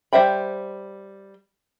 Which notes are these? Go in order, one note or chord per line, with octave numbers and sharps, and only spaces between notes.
G3 C5 E5 G5 B5